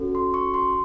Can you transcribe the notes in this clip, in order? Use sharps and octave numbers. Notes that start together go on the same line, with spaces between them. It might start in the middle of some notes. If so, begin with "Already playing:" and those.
Already playing: C#4 F#4 A4
C6
C#6
C6